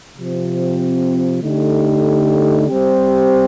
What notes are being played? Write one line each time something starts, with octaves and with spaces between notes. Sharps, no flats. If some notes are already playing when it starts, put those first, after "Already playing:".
C3 F3 C4
D3 A3 D#4 G4
G3 C4 G4 C5